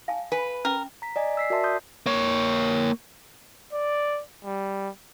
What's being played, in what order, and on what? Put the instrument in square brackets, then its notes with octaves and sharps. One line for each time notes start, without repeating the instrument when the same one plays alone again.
[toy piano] F5 G#5 A5
[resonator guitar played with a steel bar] B4 [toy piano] G#5
[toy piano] C#4 G5 [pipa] A#4
[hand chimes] A#5 B6
D5 D#5 G#5
E6 B6 C7
F#4 A#4 D5 E5 A5 C6
C6 D#6 G6
[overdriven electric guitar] A#3 C#5
[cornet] D5
G3